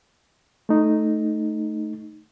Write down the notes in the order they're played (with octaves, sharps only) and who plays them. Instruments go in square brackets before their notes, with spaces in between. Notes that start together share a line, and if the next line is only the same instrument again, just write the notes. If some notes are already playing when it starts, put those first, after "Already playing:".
[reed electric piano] A3 D#4